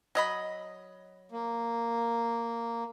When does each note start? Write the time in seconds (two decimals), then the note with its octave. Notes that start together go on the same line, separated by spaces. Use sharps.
0.15 F#3 D#5 B5
1.32 A#3